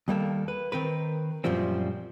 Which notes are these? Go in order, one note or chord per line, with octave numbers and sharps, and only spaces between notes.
D#2 G3 A#3 A4
B4
D#3 C4 A#4 B4
F#2 A#2 F3 G3 C4